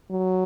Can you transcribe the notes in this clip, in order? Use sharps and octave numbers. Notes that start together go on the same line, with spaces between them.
F#3